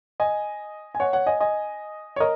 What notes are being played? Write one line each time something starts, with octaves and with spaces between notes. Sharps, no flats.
D#5 G#5
G#5
C#5 F#5
C#5 F#5
D#5 G#5
D#5 G#5
C#5
A#4 D#5